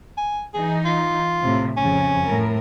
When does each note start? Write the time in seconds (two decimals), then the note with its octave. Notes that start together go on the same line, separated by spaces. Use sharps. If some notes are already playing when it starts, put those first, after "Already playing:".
0.18 G#5
0.54 E3 D#4 G#4
0.85 F4
1.41 A2 C3
1.77 F2 C#3 C#4
2.25 A2 A#4